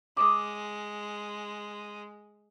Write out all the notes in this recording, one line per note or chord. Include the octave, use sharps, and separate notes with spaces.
G#3 D6 D#6